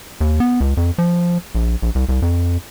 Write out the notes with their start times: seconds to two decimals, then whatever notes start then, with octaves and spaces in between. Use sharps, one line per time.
0.21 D#2
0.40 B3
0.61 C#2
0.77 F2
0.98 F3
1.55 A#1
1.82 A#1
1.95 C2
2.09 C2
2.22 F2